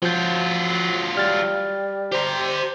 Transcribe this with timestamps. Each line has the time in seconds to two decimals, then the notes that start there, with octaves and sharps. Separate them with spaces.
0.02 F3 F#3 F4 G6
1.17 G3 F6 A6
2.12 G4 C5 A#5